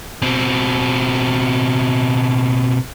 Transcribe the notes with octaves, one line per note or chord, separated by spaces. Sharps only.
B2 C4